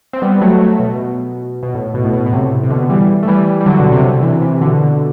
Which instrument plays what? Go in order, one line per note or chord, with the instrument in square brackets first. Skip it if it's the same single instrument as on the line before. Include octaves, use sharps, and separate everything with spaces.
[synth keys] C4
G3 B3
F#3 A3
F#3 A3
B2
B2
A2
B2
A2
B2
B2
A2 C3
C3
B2 D3
E3 G3
A3
E3 G3
G3
D3 F#3
B2
C3
B2 D3
C3 E3
C3 E3
B2 D3